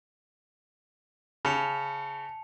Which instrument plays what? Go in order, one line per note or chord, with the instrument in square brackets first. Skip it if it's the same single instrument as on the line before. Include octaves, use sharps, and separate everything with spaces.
[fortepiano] C#3 [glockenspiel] A5 C#7 F7